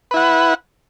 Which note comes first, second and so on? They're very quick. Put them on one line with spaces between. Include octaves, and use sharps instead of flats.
B4 E4 F#5